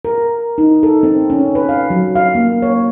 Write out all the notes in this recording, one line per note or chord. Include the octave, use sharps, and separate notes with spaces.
A#4
D#4
A4
C4
C#4
B4
F5
F#3
F5
A#3
C#5